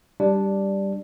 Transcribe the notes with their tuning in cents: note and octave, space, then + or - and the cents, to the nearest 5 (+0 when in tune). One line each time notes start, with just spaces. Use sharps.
G3 +0 D4 +0